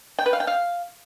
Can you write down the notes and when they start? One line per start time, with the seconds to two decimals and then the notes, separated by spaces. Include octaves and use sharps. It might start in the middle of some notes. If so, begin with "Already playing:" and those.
0.19 G5
0.26 B4
0.33 F5
0.40 G5
0.47 F5